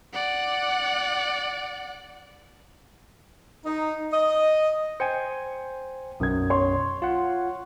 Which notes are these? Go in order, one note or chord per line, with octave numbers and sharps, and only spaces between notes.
D5 F#5
D#4
D#5
C5 G5 G#5 C#7
B1 F#2 D#6 G#6
C#5 C6
F4 F#5